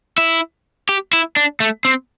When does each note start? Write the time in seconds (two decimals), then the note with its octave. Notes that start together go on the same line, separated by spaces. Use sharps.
0.18 E4
0.89 G4
1.13 E4
1.36 D4
1.60 A3
1.85 C4